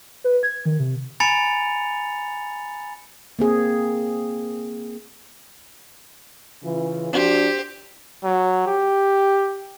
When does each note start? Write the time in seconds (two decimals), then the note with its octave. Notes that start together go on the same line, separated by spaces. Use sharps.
0.24 B4
0.43 G#6
0.65 D#3
0.79 C3
1.20 G#5 A#5 B5 A6 C#7 F7
3.39 A#3 C4 G#4
6.63 C#3 E3 F4
7.13 F3 D4 F#4 G4 C5
8.24 F#3
8.67 G4